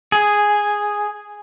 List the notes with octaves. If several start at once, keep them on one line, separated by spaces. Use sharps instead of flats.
G#4